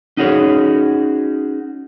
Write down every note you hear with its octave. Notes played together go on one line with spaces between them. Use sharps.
C#4 D#4 F#4 G#4 C#5